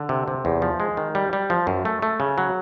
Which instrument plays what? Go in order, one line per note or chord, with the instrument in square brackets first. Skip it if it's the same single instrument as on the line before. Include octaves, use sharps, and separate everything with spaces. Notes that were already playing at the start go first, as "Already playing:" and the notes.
Already playing: [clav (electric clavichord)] D3
C3
C3
E2
F3
G#3
D#3
G3
G3
F3
F#2
A3
A3
C#3
F#3